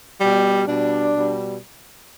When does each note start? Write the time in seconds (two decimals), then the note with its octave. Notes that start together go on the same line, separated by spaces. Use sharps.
0.21 B2 G3
0.67 B2 G3 D4
1.13 B2 G3